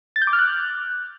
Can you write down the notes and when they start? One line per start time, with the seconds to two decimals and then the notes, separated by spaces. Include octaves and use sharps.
0.16 A6
0.22 G6
0.27 D6
0.33 F6
0.39 F#6